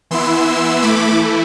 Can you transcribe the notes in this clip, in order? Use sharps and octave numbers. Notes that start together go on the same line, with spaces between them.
E3 B3 E4 C6 E6
E3 A3 E4 B5 D6